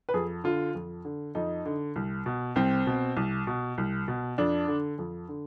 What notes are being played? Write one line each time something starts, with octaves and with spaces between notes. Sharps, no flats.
B4
F2 G#4
D3 F4
F2
D3
F2 D#4
D3
C2
B2
C2 C4
B2
C2
B2
C2
B2
F2 D4
D3
F2
D3